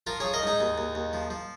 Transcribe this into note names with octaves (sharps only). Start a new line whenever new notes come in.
F3 F4 A#4
F3 G#4 C#5
A#4 D#5
G#2 D#4 G#4
D#2
D#2
D#2
F3
F3